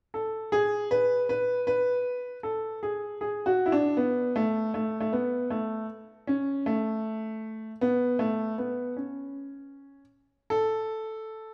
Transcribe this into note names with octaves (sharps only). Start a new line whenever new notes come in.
A4
G#4
B4
B4
B4
A4
G#4
G#4
F#4
E4
D4
B3
A3
A3
A3
B3
A3
C#4
A3
B3
A3
B3
C#4
A4